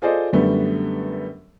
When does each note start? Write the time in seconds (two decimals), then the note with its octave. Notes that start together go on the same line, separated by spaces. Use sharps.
0.02 F4 G#4 A4 C5 D5 D#5
0.33 F#2 D3 G3 A3 B3